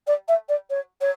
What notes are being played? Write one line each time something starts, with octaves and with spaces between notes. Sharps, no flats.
D5
E5
D5
C#5
C#5